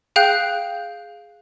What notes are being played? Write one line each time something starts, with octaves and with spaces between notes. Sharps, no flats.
G#4 F5 G5 F#6 G6